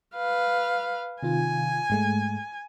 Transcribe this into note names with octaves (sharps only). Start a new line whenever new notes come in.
B4 F5
C3 D#3 F4 G#5
G#2 G#3 A3